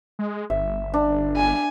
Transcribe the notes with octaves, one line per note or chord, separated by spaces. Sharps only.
G#3
G1 E5
D4
G#5